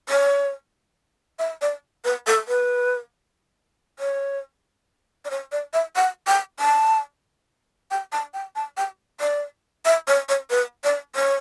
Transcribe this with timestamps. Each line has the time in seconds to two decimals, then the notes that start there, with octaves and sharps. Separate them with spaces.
0.09 C#5
1.39 E5
1.62 D5
2.05 B4
2.27 A4
2.48 B4
3.99 C#5
5.25 D5
5.30 C#5
5.52 D5
5.73 E5
5.96 F#5
6.27 G5
6.60 A5
7.91 G5
8.12 A5
8.34 G5
8.56 A5
8.77 G5
9.21 D5
9.85 E5
10.08 C#5
10.29 C#5
10.50 B4
10.84 D5
11.16 C#5